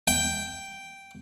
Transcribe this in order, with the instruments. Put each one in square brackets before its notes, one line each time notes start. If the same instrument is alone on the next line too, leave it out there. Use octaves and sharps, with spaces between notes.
[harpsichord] G5